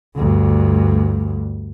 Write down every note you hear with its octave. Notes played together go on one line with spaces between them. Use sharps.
D2 G2